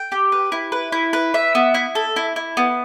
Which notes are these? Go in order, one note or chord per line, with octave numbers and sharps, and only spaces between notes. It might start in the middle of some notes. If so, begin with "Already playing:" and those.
Already playing: G5
G4
B4
E4
B4
E4
B4
E5
B3
E4
A4
E4
E4
B3